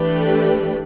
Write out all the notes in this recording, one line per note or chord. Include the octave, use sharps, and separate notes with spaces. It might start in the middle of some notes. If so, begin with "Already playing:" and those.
Already playing: E3 A3 D4 G4 B4